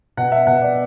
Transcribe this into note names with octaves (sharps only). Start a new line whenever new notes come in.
B2 F#5
E5
B2 F#5
D5